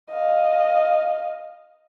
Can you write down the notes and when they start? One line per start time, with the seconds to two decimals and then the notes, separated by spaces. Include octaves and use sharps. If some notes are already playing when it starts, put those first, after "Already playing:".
0.10 D#5 F5